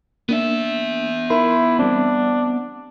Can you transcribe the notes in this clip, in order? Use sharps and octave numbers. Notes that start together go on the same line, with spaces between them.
A#3 B3 D4 E5
D#4 E4 A#4 C6
G3 C4 D4